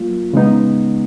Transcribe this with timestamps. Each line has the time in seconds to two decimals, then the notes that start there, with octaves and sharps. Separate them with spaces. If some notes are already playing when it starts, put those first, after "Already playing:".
Already playing: F#3 A#3 F4
0.33 C#3 G#3 B3 D#4